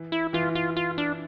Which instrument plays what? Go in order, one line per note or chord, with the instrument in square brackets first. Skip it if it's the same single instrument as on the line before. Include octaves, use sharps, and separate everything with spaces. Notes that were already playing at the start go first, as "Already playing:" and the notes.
Already playing: [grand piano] E3
[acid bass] E4
[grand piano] E3 [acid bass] F4
[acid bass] F4
F4
D4